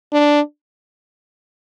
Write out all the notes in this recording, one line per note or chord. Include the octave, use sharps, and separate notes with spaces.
D4